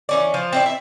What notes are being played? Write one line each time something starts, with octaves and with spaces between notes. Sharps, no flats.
E3 C#4 D5
F3 F4
C4 E4 D5
E5